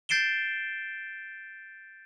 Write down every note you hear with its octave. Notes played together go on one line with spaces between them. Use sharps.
G6 A6 C7 D7 E7 G7